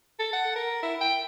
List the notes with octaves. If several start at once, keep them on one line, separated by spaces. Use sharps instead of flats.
A4
F#5
A#4
E4
G5